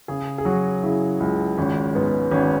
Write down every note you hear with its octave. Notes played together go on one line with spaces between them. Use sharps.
C#3 G#4
G#4
F#3 F#4
C#3 E4
C#2
G#1 C#4
G#2 B3
G#1 C#4